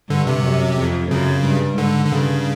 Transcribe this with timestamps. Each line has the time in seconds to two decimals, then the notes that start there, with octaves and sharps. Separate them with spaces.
0.10 G2 D3
0.27 C3
0.44 F#2
0.78 F2
1.11 F#2 C#3
1.44 G2
1.78 G#2 D3
2.06 D3
2.12 G2 C#3